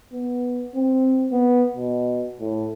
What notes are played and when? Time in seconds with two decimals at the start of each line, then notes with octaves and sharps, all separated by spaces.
0.13 B3
0.75 C4
1.32 B3
1.76 B2
2.40 A2